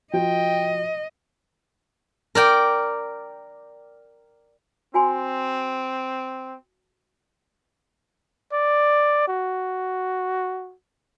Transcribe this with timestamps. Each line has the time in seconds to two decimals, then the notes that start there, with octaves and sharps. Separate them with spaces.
0.13 F3 F#4 D#5 G5
2.35 A#4 D5 G5
4.94 C4 F#4 G#5 C6
8.52 D5
9.28 F#4